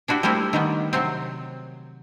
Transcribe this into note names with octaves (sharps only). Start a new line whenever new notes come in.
D4 E4 F#4 G4
G3 A3 A#3 C4 E4
D#3 G3 B3
C3 F#3 C4